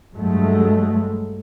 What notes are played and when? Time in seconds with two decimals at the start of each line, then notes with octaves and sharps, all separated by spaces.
0.14 G2 F#3 G#3 A3